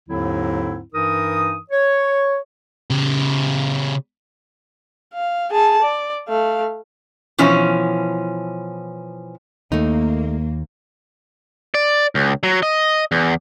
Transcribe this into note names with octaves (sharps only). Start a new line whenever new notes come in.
D#2 G#2 D3 F#3 C4 E4
G2 E3 D#4 A#4 D#6
C#5
C#3 G4
F5
G#4 A5
D5
A3 F5
B2 E3 F3 C#4
D#2 A3 A#3 D#4
D5
C#2
F#3
D#5
E2